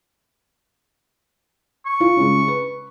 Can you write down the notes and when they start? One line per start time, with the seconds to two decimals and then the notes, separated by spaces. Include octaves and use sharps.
1.86 C#6
2.00 F4
2.17 C#3 G#3
2.48 B4